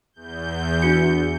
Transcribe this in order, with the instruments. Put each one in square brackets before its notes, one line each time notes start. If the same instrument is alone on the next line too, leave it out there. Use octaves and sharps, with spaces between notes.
[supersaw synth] E2 G6
[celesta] D4 F#4 C#7